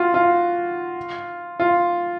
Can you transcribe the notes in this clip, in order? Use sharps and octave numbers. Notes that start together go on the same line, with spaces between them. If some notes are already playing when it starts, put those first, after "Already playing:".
Already playing: F4 F#4
F4
F4